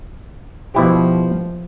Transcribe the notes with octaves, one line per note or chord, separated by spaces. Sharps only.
B2 F3 E4 G4